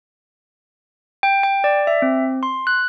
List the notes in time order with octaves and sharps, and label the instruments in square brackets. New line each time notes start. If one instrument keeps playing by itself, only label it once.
[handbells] G5
G5
D5
E5
C4
C6
F#6